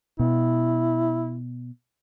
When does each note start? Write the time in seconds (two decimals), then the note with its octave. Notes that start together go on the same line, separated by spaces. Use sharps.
0.19 B2 E4